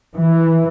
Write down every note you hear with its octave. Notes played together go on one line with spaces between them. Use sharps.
E3